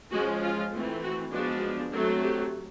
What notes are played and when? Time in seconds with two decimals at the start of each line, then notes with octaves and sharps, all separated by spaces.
0.11 F3 G#3 C#4 F#4
0.42 F4
0.72 E3 A3 C4
1.02 F#4
1.32 F3 G#3 B3 D4 F#4
1.92 F#3 A3 C4
2.22 G4